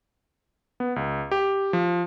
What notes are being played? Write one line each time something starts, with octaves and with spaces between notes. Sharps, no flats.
B3
C#2
G4
F3